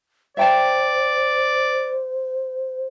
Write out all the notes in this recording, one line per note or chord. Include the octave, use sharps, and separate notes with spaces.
C5 D5 E5 G5 A5